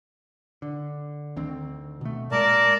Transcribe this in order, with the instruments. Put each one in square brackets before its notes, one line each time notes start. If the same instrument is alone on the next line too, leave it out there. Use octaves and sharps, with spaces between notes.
[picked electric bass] D3
D2 D#3 C4
B2 A3
[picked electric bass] A#2 G#3 [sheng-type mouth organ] A#4 D5 A5